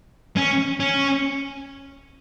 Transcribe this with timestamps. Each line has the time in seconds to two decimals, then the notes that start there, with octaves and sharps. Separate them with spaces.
0.37 C#4
0.80 C#4